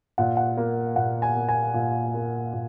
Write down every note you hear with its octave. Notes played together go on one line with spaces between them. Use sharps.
A#2 F#5
F#5
A#3
A#2 F#5
G#5
A#3
G#5
A#2
A#3
A#2